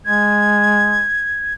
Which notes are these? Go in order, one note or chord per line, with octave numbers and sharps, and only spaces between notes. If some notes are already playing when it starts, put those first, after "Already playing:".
G#3 G#6